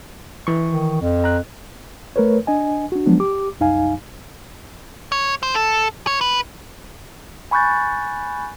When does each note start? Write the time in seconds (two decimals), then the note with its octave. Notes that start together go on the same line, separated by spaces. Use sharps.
0.47 E3 C#6
0.70 D#3
1.01 F2
1.24 A#5 F#6
2.16 A3 A#4 B4 C#5
2.47 D4 D#5 G#5
2.92 D4 F#4
3.06 F3 F#3 G#3 B3 D4
3.20 G4 D6
3.60 C2 F#2 D#4 F5 G#5
5.12 C#5
5.43 C5
5.54 A4
6.07 C#5
6.21 B4
7.51 G#5 B5 C#6 F#6 G6 A6